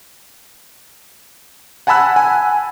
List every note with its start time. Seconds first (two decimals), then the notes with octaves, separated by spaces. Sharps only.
1.87 F#5 G#5 A5 B5 E6 F#6
2.16 G#5